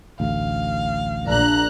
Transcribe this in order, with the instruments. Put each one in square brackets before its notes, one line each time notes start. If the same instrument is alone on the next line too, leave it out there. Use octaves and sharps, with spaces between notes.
[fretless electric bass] A1 D2 [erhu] F5
[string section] A#1 A#5 F#6 [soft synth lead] D4